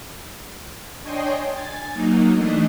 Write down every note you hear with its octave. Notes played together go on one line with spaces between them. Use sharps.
D4 C#5 D#5 G5 G#5 C6
G#5 A6
F#3 A#3 D#4
E3 A3 D4 D#5